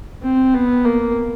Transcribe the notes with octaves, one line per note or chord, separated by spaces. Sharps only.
C4
B3
A#3